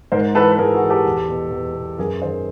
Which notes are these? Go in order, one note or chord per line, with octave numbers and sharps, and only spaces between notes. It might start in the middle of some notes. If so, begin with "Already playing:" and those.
G#2 A#4 C5
E3 A4 B4
B4
G#2 G#4 A#4
F#4 G#4
E3
G4 A4
E2
B2
E2
B2
F#2 G#4 A#4
D#3 A#4 C5